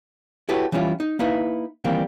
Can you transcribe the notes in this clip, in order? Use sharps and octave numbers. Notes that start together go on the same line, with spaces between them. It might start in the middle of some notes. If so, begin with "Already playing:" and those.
E4 F#4 G4 A4 B4 C#5
E3 G3 C#4 E4 F4
D#4
A#3 D#4 E4 B4
D#3 E3 G3 A#3 C4